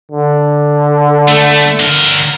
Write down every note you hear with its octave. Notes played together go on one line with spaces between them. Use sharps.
D3
A3
D3 A#4